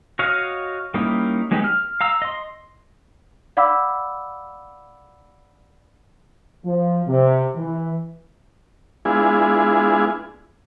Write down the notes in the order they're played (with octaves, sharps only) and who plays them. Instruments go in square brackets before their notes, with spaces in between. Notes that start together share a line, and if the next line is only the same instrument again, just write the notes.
[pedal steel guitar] F#4 C#5 D#5 F5
G3 A#3 C#4 D#4 E4
F#3 G#3 B3 D#4 G4
F6
F5 A#5 E6
D#5 C6
[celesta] D5 F5 F#5 B5 D6 E6
[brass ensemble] F3
C3
E3
[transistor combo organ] G#3 B3 D4 E4 F4 G#4